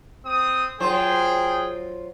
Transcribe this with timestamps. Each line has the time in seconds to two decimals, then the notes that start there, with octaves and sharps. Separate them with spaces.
0.25 C4 D#6
0.80 F#3 F4 G#4 A#4 C5 G5